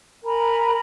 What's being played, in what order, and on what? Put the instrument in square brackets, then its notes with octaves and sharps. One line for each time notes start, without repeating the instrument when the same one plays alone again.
[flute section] A#4 G#5 A#5 B5